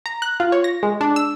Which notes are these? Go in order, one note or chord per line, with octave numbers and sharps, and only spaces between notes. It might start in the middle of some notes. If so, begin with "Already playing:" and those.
A#5
F#6
F4
C#5
A#6
G#3
D4
E6